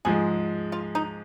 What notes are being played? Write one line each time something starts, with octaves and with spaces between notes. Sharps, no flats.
G#2 F3 G#3 G#4
F4
D#4